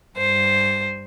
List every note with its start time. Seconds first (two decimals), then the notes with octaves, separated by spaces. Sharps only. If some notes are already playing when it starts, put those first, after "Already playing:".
0.18 G2 C5